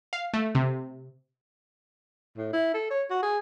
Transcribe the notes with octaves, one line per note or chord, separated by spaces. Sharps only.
F5
A3
C3
A2
E4
A4
C#5
F#4
G#4